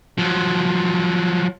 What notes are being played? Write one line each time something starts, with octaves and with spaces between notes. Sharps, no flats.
F3 F#3